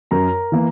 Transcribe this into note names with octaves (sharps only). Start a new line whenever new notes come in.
F#2 A#4 A#5
E3 A#3